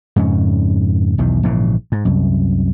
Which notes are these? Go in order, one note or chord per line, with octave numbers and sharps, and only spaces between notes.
F2 G#2 C#3 C#4
B1 E2 D#3
A#1 G#2 C#3 E3
G#2
C2 F#2